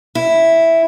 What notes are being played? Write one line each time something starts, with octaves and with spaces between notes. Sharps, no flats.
E4